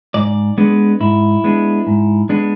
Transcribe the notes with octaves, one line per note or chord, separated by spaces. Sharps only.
G#2 D5
G#3 B3 D4
G#2 E4
G#3 B3 D4
G#2
G#3 B3 D4